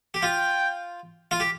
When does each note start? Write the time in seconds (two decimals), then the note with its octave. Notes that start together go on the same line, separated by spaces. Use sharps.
0.14 G4
0.22 F4 G5
1.31 F4
1.40 G4